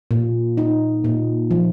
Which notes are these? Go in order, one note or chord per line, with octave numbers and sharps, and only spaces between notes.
A#2
D#4
A#2
F3